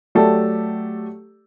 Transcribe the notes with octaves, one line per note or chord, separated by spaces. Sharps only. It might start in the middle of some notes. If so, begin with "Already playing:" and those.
F#3 A3 G4 A4 D5